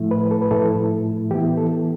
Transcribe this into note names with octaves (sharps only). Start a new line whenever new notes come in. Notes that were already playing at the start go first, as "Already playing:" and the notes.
Already playing: A2 F3 A3 E4
B4
A4
B4
A2 F3 A3 E4 A4
E3 B3 E4 G4
A4